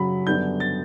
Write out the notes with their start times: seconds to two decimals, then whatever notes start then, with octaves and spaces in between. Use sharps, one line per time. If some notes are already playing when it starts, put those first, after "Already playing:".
Already playing: F#2 C#3 F#3 B5
0.26 F#2 D3 G3 B3 D4 G6
0.60 A6